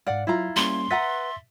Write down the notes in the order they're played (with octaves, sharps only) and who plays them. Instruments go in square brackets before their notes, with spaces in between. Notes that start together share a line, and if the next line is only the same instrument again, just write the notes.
[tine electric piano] G#2 F5 [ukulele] D5 F#5
[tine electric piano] F#3 [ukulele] E4 F4 A#5
[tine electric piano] G3 A#3 C#4 [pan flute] C6
[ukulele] B4 F#5 A#5 [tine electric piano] E5 A6 B6